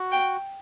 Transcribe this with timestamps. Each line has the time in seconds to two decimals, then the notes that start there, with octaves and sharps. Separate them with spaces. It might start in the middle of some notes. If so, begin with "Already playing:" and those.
Already playing: F#4
0.12 G5